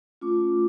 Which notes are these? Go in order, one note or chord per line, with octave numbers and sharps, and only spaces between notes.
A3 C#4 F4 D6